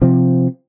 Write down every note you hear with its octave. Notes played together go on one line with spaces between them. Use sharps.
C3 F3 C4